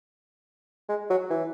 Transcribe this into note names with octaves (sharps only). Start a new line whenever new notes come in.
G#3
F#3
E3